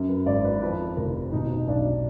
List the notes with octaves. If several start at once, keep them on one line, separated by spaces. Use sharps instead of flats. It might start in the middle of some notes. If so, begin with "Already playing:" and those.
Already playing: F#2
B4
G#1 D5
B4
F2 B4
F1 A#4
B2 D#4
B1 D4